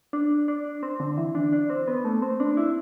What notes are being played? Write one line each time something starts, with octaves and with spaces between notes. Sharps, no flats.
D4
D4
C4
D3
E3
D4
D4
C4
B3
A3
C4
D4
E4